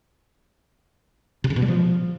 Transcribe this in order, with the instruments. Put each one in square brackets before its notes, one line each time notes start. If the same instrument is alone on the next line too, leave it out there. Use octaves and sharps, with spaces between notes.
[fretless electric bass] C3
C#3
B2
G3
F3